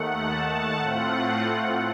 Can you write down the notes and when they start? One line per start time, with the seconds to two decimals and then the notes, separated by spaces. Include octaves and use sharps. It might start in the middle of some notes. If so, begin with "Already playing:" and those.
Already playing: D#2 D#3 A3 F#5
0.27 A5
0.79 A2 A3 C4 F4 F#5